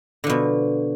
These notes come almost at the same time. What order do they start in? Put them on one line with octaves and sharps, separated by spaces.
D3 F3 B2